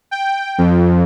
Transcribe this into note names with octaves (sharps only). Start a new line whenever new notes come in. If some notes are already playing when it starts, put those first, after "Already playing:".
G5
F2